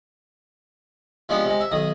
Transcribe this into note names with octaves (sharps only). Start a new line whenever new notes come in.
C3 F3 G#3 B3 D4
C3 G#3
E5
B1 D#3 D#6